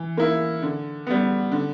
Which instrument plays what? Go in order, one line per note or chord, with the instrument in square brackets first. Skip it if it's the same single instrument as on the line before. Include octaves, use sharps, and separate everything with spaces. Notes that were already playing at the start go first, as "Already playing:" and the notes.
Already playing: [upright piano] E3
A#3 E4
D3
G3 B3
D3